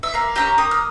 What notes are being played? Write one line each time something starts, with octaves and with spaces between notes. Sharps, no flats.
E5
A#3 F5
C#4 E4 G4 A#5
A#3 D#6
F6